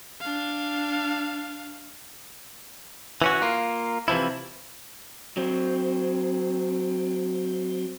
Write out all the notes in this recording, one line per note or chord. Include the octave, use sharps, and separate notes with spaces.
D4 F5
E3 C#4 F#4
A#3 F4
C3 E3 F3 E4
F#3 C4